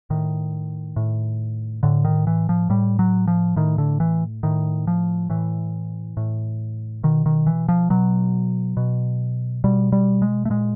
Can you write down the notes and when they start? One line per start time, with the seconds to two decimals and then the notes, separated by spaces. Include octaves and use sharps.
0.10 A2 D#3
0.96 A2
1.83 A2 D3
2.05 D#3
2.27 E3
2.49 F3
2.70 A2 G3
2.99 F#3
3.27 F3
3.56 A2 D#3
3.78 D3
4.00 E3
4.43 A2 D#3
4.87 F3
5.30 A2 E3
6.17 A2
7.03 B2 D#3
7.26 D#3
7.47 E3
7.69 F3
7.90 B2 F#3
8.77 B2
9.64 B2 G3
9.92 G3
10.22 G#3
10.45 A3
10.50 A#2 G#3